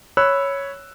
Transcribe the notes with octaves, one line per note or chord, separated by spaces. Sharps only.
C#5 B5 E6 F#6